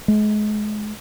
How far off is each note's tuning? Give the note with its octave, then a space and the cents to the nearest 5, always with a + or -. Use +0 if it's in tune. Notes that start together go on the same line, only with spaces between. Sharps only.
G#3 +30